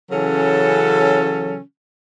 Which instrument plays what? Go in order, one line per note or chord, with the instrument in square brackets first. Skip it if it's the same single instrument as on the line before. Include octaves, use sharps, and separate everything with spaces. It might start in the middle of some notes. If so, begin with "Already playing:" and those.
[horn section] C#3 E3 F#3 C#4 A4